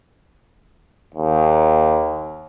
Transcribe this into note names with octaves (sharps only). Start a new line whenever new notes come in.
D#2